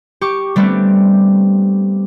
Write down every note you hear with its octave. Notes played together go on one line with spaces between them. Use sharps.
G4 C#6 D6
G3 A3 B3 C4 D4